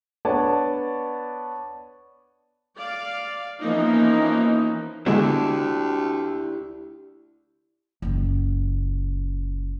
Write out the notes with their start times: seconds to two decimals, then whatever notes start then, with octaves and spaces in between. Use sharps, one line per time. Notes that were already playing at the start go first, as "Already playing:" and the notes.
0.25 B3 D4 C#5 D5 A5
2.77 D5 F5
3.60 E3 F3 A#3 B3 C#4 D#4
5.06 D2 D3 G#3 B3 D4 E4 G4
8.02 F#1 C#2